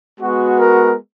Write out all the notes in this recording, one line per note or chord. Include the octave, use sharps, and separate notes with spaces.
G#3 B3 F#4
A#4